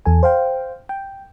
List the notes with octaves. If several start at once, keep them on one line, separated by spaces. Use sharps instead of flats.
E2 A4 G#5
C5 F5 G5
G5